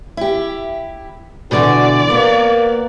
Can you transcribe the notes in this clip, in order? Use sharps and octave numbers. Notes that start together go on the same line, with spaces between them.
E4 G4
B2 D3 E3 F#4 D5
A#3 B3